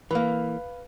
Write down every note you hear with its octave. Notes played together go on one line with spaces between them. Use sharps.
E3 A#3 B4 F5